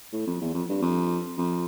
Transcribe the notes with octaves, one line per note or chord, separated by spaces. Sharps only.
A2
F2
E2
F2
G2
F2
F2